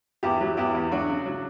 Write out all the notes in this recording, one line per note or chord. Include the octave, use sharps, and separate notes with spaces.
E2 E4 G4
F#3
E2 E4 G4
E2
F#3 D4 F#4
C#3
F#3